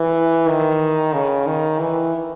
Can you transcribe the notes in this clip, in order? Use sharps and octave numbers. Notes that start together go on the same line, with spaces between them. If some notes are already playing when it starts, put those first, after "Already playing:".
Already playing: E3
D#3
C#3
D#3
E3